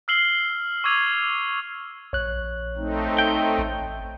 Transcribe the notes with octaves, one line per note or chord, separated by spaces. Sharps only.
E6 F6 C7 F#7 G7
C#6 D6 E6 G#6 D#7 F7
A#1 C#5 F#6
A3 C4 D#4
G5
A1